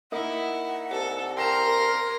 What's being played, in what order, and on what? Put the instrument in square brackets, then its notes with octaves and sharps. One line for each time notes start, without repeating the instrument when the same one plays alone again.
[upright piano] A#3 D#4 D#5 [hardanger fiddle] E4 [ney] F#5
[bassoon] C2 [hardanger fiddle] A4
[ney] A#4 [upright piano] G5 A#6 E7 [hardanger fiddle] A#5 C6